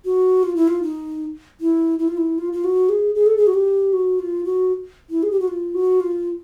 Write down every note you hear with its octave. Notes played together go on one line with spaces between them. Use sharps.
F#4
F4
E4
F4
D#4
E4
E4
F4
E4
F4
F4
F#4
G#4
G#4
A4
G#4
F#4
G4
F#4
F4
F#4
E4
G#4
G4
F#4
F4
F#4
F4